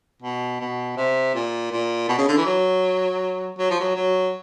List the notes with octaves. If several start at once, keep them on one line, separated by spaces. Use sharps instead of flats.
B2
B2
C3
A#2
A#2
B2
C#3
D3
E3
F#3
F#3
F3
F#3
F#3